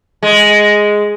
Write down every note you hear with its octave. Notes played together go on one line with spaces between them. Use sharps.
G#3